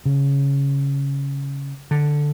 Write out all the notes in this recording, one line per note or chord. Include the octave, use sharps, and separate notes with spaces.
C#3
D3